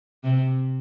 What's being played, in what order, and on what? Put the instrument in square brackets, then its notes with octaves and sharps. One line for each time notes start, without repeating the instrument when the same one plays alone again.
[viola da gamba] C3